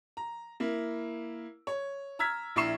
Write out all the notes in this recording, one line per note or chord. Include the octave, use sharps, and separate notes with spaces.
A#5
A#3 E4
C#5
A#5 E6 F6 G#6 B6
A#1 E4 A#5 C#6 C7 E7